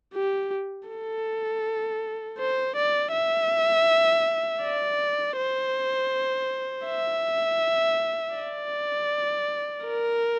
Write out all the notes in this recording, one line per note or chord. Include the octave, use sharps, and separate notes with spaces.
G4
A4
C5
D5
E5
D5
C5
E5
D5
A#4